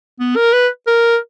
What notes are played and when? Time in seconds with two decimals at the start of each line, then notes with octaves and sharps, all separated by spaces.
0.20 B3
0.36 A#4
0.53 B4
0.87 A#4